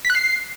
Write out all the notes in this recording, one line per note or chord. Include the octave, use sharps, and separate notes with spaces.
B6
F#6
C7